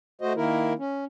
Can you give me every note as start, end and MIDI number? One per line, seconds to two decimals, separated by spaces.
0.22 0.33 57
0.22 0.33 66
0.22 0.33 72
0.22 0.33 75
0.36 0.73 51
0.36 0.73 58
0.36 0.73 64
0.36 0.73 70
0.79 1.05 61